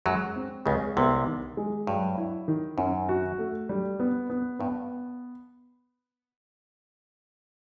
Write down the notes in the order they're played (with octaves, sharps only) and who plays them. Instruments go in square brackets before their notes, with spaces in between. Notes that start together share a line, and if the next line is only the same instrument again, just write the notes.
[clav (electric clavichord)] F#2 F#3 [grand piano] G#3
[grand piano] C4
[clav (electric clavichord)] C#2 C#3 [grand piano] G#3
[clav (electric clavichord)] C2 C3 [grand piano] B3
[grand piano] D#3
G#3
[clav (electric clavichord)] G2 [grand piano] F#3
[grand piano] E4
D#3
[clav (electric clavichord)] F#2 [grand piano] C#4
[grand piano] F#4
A3
G3
B3
B3
[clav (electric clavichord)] G2 [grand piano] B3